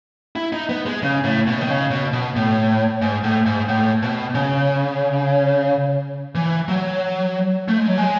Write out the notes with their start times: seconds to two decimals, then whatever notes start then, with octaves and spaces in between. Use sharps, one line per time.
0.36 E4
0.53 D#4
0.69 B3
0.86 G#3
1.02 C#3
1.24 A2
1.47 B2
1.61 D#3
1.69 C#3
1.91 B2
2.13 B2
2.36 A2
3.02 G#2
3.24 A2
3.46 G#2
3.68 A2
4.02 B2
4.35 C#3
6.35 E3
6.68 F#3
7.68 A3
7.78 G#3
7.88 F#3
7.98 G#3